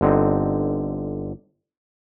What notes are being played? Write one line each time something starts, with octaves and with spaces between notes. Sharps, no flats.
G1 D3 C4 D#4